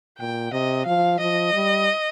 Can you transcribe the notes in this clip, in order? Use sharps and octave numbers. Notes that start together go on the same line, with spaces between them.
A#2 G5
C3 D#5
F3 F5
F3 D#5
G3